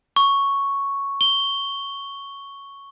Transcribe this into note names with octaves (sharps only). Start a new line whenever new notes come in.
C#6
G7